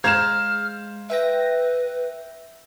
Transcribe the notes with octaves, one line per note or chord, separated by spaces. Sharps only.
G#3 C5 F5 A#5 F6 G#6 E7
B4 E5 G5 A#6